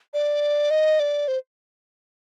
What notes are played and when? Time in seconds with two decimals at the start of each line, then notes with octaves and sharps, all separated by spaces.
0.14 D5
0.71 D#5
1.00 D5
1.28 C5